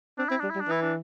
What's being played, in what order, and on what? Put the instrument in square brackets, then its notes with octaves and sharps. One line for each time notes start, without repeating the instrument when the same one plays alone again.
[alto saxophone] C4 [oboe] D4
[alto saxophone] C4 [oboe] E4
[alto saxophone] G3 [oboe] D4
[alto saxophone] G3 [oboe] E4
[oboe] D4
[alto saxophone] E3 [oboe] E4
[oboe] D4